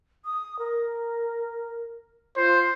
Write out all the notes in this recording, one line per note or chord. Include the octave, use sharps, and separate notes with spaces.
D#6
A#4
F4 C5